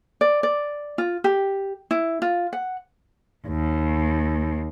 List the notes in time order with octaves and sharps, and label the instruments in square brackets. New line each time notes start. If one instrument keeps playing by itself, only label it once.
[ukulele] D5
D5
F4
G4
E4
F4
F#5
[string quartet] D#2